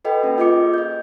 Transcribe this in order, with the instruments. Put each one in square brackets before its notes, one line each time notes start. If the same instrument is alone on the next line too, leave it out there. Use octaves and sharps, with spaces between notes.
[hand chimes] F#4 A4 B4 D#5 G5
A#3 C#4 D#5
A#3 F4 G#4 D#5 D6 C#7
D#5 G6